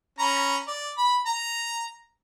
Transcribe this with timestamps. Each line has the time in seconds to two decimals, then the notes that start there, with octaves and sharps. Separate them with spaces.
0.19 C#4 A#5 B5
0.68 D5
0.98 B5
1.26 A#5